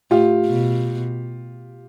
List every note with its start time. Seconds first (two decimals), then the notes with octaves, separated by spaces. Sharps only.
0.11 A2 F4 G4
0.46 B2